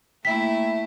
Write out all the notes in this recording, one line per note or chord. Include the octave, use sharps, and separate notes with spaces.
A3 A#3 E4 E5 G5 B6